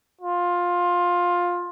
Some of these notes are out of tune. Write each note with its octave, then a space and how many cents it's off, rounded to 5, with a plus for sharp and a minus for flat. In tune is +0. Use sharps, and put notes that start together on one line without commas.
F4 +15